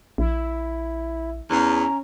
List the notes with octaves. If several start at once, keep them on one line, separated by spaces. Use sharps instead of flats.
A#1 E4
E2 C#4 A#5